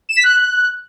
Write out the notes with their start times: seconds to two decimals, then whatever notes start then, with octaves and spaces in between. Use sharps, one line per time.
0.09 E7
0.16 B6
0.23 F#6